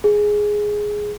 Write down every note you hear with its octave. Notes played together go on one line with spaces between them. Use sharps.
G#4